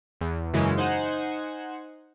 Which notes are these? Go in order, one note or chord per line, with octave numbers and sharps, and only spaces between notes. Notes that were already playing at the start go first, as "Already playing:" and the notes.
E2
F#2 C#3 E3 G#3
D#4 C5 F#5 G#5